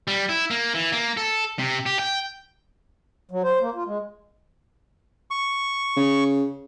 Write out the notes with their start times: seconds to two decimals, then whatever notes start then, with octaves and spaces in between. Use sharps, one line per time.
0.08 G3
0.29 E4
0.51 A#3
0.74 E3
0.92 A#3
1.17 A4
1.59 C3
1.86 G4
1.99 G5
3.31 F#3
3.44 C5
3.61 A#3
3.75 F4
3.86 G#3
5.31 C#6
5.96 C#3